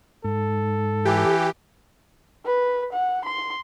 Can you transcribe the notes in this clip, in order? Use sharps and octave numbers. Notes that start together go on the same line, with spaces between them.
G#2 A4
E3 G4
B4
F#5
C6